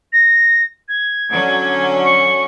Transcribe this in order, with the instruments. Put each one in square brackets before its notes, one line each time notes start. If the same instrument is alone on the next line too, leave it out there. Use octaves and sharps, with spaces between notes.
[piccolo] A#6
G#6
[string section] D3 F#3 C#4
[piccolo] C#6